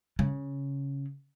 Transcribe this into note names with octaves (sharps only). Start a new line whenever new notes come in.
C#3